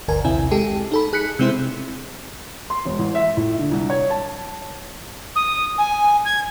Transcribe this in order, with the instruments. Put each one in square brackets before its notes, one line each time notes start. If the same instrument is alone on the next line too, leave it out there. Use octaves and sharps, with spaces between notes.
[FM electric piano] G1 D2 A#4 G#5
A#1 D#2 C3 C4 E4 G#5
G#3 G4 A4
D#4 A4 B5
G#4 F#6 B6 C#7
C3 G#3 C4 E4 C5
[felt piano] C6
E1
A1
E5
A2
D3
C2
C#5
A5
[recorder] D#6
G#5
G#6